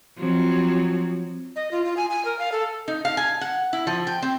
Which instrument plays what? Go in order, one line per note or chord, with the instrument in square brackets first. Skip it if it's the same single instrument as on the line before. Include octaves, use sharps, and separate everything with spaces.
[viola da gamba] F3 F#3 C4
[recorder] D#5
F4
F4
G#5
G#5
A#4
F5
A4
[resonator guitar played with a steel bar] D#4
F5
G#5
F#5
E4
F3
G5
C4